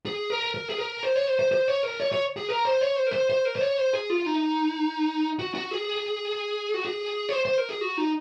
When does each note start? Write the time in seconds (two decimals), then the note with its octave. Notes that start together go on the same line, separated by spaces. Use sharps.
0.06 G#4
0.30 A#4
0.54 A#4
0.70 G#4
0.78 A#4
1.03 C5
1.15 C#5
1.27 C5
1.39 C5
1.52 C5
1.68 C#5
1.83 A#4
2.00 C#5
2.12 C#5
2.37 G#4
2.49 A#4
2.65 C5
2.81 C#5
2.96 C5
3.07 A#4
3.13 C5
3.30 C5
3.45 A#4
3.56 C5
3.61 C#5
3.78 C5
3.93 G#4
4.10 F4
4.26 D#4
5.39 F#4
5.55 F#4
5.71 G#4
6.74 F#4
6.85 G#4
7.29 C#5
7.33 C5
7.45 C5
7.58 A#4
7.70 G#4
7.81 F#4
7.98 D#4